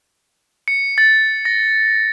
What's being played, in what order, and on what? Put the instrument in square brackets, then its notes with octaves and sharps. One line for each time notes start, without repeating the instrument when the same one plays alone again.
[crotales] C#7
A6
A#6